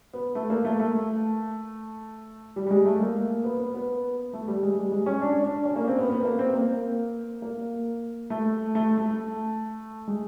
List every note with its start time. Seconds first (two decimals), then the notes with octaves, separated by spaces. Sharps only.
0.13 B3
0.35 A3
0.50 A#3
0.65 A3
0.80 A3
2.56 G3
2.66 G3
2.71 G#3
2.86 A3
3.00 A#3
3.44 B3
3.59 B3
3.74 B3
4.33 A3
4.48 G3
4.63 G#3
4.77 G3
4.92 G#3
5.06 C#4
5.21 D4
5.44 D4
5.65 C#4
5.76 A#3
5.88 C4
5.99 B3
6.10 B3
6.25 A#3
6.39 C4
6.53 A#3
7.42 A#3
8.30 A3
8.75 A3
8.98 A3
10.08 G#3